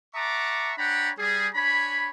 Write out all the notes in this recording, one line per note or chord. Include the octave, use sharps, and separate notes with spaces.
E5 F#5 A5 A#5 C#6 D6
D4 C#5 F#5 G5 A#5 B5
G3 G#4
D4 C#5 G#5 B5